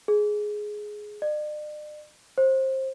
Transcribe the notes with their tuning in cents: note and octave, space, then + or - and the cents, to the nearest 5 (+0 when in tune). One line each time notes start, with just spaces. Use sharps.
G#4 +10
D5 +45
C5 +20